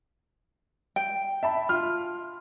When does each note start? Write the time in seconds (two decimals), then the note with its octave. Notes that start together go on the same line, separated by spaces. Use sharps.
0.96 G5
1.43 E5 A5 B5
1.69 F4 F6